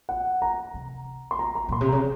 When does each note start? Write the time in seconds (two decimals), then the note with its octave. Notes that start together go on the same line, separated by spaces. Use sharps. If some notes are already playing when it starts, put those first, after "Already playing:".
0.09 F#5
0.42 A#5
0.74 C3
1.31 C6
1.39 A#5
1.55 A#5
1.69 A#2 C6
1.81 C3
1.89 C#3 A#5